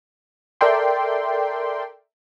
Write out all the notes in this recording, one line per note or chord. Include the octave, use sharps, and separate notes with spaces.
A4 A#4 D5 E5 G5 C6